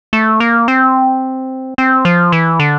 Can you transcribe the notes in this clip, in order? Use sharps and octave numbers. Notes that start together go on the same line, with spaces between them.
A3
A#3
C4
C4
F3
E3
D3